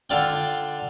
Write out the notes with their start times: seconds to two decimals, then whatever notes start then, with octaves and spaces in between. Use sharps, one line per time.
0.10 D3 F4 D5 G5